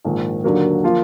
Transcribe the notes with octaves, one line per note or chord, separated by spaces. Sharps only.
A#1 G#2 D#3
D#2 D3 F#3 A#3
F3 A#3 F4